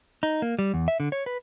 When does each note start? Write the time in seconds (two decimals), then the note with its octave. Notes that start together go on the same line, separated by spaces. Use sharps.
0.23 D#4
0.42 A#3
0.59 G3
0.74 E2
0.88 E5
1.00 D3
1.12 C#5
1.26 B4